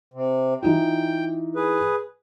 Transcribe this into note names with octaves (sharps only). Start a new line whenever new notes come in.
C3
E3 D#4 F4 G5
G#4 B4